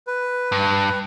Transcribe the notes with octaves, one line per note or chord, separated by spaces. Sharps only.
B4
G2